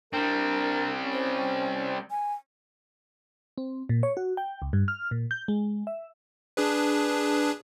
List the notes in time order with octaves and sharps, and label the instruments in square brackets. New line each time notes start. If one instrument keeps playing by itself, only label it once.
[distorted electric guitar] G3 C4 [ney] D4 [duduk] A#4
[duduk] C#4
[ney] C5
G#5
[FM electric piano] C4
A#2
C#5
F#4
G5
C#2
G2
F6
A#2
G6
G#3
E5
[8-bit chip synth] D4 G#4 B4